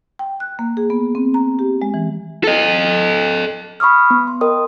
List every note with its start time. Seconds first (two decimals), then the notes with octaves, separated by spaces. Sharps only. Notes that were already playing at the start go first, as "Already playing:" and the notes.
0.19 G5
0.40 F#6
0.59 A#3
0.77 G#4
0.90 B3
1.15 C4
1.34 A#5
1.59 G4
1.82 G#3
1.94 E3
2.44 A4 D#5
3.80 B5 C#6 D#6 F6
4.11 B3
4.27 C6
4.41 A#4 D#5 G5 D#6